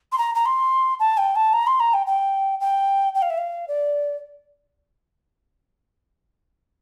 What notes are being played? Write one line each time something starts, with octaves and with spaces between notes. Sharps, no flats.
C6
A#5
A#5
C6
A5
G5
A5
A#5
C6
A#5
G5
G5
G5
G5
F5
E5
F5
D5